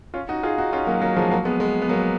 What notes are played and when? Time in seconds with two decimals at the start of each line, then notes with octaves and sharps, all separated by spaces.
0.14 C#4 F4
0.29 D#4 F#4
0.43 F4 G#4
0.58 D#4 F#4
0.73 C#4 F4
0.87 F#3 A#3
1.02 F#3 A#3
1.17 F3 G#3
1.31 F#3 A#3
1.45 G#3 B3
1.60 G#3 B3
1.82 B3
1.89 F#3 A#3